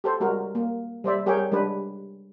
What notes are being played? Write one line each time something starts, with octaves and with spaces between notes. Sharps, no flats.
G4 A4 C5
G3 G#3 F#4 A#4
A#3
G3 C5 D5 E5
G3 G4 G#4 A#4 C#5 G5
G3 G#3 D4 B4